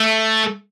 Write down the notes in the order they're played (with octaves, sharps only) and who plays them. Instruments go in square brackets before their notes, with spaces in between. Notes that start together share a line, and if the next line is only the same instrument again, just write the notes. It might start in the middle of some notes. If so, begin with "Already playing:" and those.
Already playing: [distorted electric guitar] A3